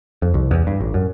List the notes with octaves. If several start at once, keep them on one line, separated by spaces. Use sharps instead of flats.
F2
C2
E2
G2
A1
F#2